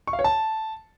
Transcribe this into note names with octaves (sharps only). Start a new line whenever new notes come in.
C#6
F5
C#5
A5